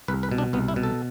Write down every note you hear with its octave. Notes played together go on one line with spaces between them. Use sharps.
C2 B4
B4
B2
D4
C2 B3
E4
B2
A4